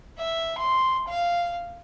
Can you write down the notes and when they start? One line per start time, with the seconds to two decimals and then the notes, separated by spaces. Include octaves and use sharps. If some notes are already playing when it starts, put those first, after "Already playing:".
0.19 E5
0.59 C6
1.08 F5